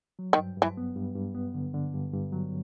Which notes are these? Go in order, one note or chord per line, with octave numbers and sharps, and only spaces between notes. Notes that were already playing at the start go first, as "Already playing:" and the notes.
F#3
D#3
G2
G2 E3
B3
G2
G2
B3
D3
D3
G2
G2
F#3